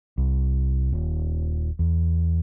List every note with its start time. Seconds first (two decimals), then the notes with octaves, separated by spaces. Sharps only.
0.18 C2
0.92 D#1
1.79 E2